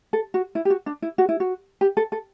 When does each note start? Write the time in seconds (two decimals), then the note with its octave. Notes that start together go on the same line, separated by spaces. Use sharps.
0.13 A4
0.34 F#4
0.55 E4
0.65 G4
0.70 F#4
0.86 D4
1.02 E4
1.18 F#4
1.29 E4
1.40 F#4
1.81 G4
1.97 A4
2.12 A4